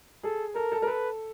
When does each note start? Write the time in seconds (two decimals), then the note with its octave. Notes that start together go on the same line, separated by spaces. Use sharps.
0.24 G#4 A4
0.55 A4 A#4
0.72 A4
0.82 A#4
0.87 A4 B4